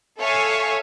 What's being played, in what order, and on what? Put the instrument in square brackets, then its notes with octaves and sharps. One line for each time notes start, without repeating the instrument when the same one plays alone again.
[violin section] A4 C#5 E5 F5 G#5